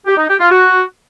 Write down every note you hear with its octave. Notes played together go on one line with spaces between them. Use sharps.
G4
D#4
G4
F4
F#4